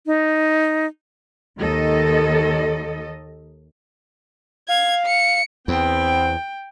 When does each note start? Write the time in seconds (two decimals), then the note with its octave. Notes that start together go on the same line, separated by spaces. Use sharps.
0.06 D#4
1.59 D#2 D#3 A4 D#5
4.69 F5 G#6
5.06 C#7
5.68 E2 B3 C4 G5